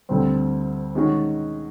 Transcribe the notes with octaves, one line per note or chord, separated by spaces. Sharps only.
D2 D3 G3 C4
D#3 G#3 C#4 F#4